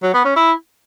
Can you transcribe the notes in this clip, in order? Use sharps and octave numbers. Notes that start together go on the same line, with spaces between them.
F#3
B3
C#4
E4